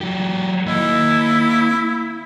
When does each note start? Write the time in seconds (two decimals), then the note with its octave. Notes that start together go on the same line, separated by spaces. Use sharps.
0.01 F#3 G4
0.67 A#3 E4 D#5